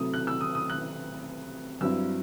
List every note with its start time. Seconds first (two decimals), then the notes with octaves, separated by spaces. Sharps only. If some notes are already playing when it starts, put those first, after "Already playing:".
Already playing: C3 F#3 A3 E4 D#6
0.14 F#6
0.27 E6
0.41 D#6
0.55 D#6
0.70 F#6
1.81 G2 F#3 C4 E4 E6